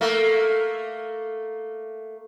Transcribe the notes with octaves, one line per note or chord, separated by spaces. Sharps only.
A3 A#3